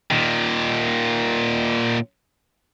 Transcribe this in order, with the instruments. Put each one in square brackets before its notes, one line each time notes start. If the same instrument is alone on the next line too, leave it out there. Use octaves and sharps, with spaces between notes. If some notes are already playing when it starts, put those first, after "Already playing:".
[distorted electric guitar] A#2 D#3